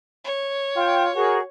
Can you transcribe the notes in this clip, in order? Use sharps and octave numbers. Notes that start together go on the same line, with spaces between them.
C#5
F4 G5
F#4 G#4 A#4